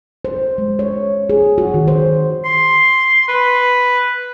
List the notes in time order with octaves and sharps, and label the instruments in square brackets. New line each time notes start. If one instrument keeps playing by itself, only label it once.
[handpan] C5
G#3
C#5
G#4
F#4
D#3
C5
[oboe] C6
B4